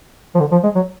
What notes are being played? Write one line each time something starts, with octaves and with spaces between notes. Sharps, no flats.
F3
D3
F3
G#3
F#3